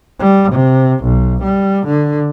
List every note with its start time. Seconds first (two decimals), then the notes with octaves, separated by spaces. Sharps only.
0.20 G3
0.52 C3
1.03 B1
1.43 G3
1.87 D3